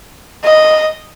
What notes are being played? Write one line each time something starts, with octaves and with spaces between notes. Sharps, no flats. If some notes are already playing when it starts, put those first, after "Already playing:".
D#5